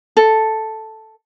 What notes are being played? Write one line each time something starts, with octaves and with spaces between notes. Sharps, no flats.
A4